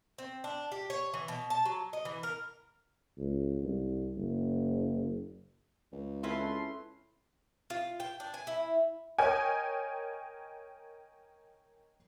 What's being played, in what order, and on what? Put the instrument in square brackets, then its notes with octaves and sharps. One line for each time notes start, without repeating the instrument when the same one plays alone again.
[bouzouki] C4
D4
G4
C#5
E3
B2
A5
F#3
D#5
E3
A#4
[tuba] C#2
C2
F#1
[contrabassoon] C#2
[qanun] C4 C#4 B4 [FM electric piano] E4 [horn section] A4 C6
[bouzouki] F4
G5
D4
G#5
E4
[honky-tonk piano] A#4 C#5 D#5 G5 G#5